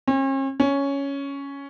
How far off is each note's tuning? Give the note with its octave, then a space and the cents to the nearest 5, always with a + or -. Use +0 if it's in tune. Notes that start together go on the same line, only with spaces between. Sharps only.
C#4 -45
C#4 +5